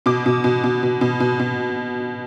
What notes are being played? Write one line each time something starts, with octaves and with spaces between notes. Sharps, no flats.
B2 D6
B2
B2
B2
B2
B2
B2
B2